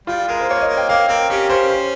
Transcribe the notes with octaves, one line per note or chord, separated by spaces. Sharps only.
G3 F4
G#3 A#4
C5
A#3 C#5
D#5
A#3
G5
A#3 F5
C4 A#4
C#4 G4
C#4 C5
C5